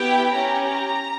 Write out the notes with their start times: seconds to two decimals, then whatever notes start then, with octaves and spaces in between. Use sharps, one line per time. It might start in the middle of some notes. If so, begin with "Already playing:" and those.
Already playing: B3 E4 G4 G5
0.34 C#4 G4 A#5